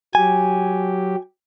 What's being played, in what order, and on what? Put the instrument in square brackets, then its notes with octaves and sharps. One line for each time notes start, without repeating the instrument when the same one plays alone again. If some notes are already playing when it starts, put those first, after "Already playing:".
[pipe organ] F#3 G4 [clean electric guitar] G#5